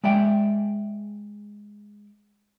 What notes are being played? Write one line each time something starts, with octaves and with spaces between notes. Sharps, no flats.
G#3 D5 E5 G5